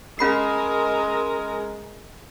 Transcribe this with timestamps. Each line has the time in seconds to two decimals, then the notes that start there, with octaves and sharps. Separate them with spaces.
0.19 G#3 C#4 A#4 A#5 B5 C7